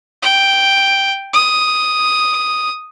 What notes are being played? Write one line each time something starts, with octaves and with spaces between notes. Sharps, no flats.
G5
D#6